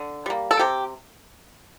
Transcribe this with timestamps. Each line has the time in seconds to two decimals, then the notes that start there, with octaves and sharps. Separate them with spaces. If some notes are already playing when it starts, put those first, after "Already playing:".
Already playing: D3
0.26 G3 A#3
0.51 A4
0.59 C3 G4